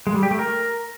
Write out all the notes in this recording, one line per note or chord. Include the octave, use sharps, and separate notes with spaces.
G#3
G3
G4
A3
A#4